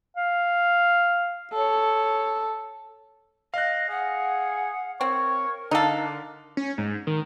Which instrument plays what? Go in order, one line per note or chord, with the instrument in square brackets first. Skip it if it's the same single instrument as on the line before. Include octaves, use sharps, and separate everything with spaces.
[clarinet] F5
[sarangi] A4 [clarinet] C#5
[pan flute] D#5 [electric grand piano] F5 F#6
[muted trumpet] G#4 [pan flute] F#5
[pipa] C4 [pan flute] A#4 [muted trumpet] C#5
[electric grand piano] D3 F5 [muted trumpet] D4 [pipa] D#4 A4
[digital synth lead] C#4
G#2
D#3